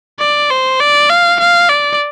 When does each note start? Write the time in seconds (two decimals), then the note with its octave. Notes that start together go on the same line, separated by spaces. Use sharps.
0.20 D5
0.50 C5
0.80 D5
1.10 F5
1.40 F5
1.69 D5